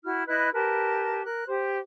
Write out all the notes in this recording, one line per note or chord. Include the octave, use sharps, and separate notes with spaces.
E4 F#4 F6
E4 B4 D#5 F#6
G4 A#4 B4 A5
A#4 F#6
G4 C5